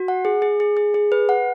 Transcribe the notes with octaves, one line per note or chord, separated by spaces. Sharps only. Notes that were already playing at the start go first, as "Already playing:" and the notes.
Already playing: F#4
F#5
G#4
G#4
G#4
G#4
G#4
B4
F#5